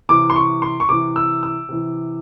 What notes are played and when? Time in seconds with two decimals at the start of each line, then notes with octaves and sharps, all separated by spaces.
0.09 C3 E3 D6
0.30 C6
0.36 C#6
0.62 C6
0.80 C#6
0.89 C3 E3 D6
1.16 E6
1.43 E6
1.69 C3 E3